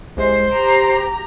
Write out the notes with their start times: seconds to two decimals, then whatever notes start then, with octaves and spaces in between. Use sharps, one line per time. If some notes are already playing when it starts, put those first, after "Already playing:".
0.17 C2 C3 G#3 C5
0.51 G4 A#5 D7